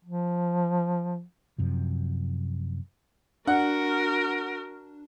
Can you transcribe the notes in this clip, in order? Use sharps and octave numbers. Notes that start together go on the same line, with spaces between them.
F3
F#2 C3 F3
D4 F#4 A#4 F#5